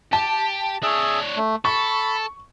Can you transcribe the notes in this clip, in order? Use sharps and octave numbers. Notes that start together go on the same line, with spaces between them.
G4 A5
D4 G#4 C#5 E5
A3
A4 B5 C#6